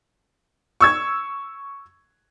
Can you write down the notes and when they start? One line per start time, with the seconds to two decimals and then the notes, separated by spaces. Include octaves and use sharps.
0.81 C#6 E6 G#6